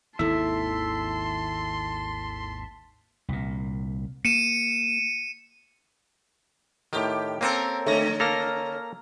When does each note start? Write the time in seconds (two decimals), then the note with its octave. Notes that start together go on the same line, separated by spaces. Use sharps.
0.19 G#1 D#2 G#2 E4 A4 E5 A5 C6
3.29 C2 A#2
4.25 A#3 C#7 D#7 E7
6.93 A2 D#3 G4
7.41 A#3 C4 C#4 A4 A#4
7.86 D3 A3 C#4 C#5 A#6
8.20 A#3 A4 A#5 F6 A#6